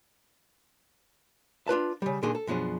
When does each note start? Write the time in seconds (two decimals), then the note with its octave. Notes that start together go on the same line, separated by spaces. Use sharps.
1.68 D4 F4 B4 A5
2.02 C#3 G3
2.23 A#2 D3 D#3 G#3 G#4
2.35 A4
2.47 F#2 B2 F3 D4 G#4